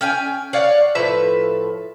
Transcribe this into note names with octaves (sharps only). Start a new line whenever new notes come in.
C#4 G5 G#5
C#5 D5 F5 F#5
A2 F3 B4 E5